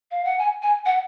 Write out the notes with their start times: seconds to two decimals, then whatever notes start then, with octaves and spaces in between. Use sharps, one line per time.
0.11 F5
0.25 F#5
0.39 G#5
0.62 G#5
0.86 F#5